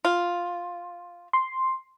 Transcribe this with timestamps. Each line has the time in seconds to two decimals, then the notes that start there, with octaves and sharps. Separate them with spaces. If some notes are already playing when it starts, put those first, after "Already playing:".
0.05 F4
1.33 C6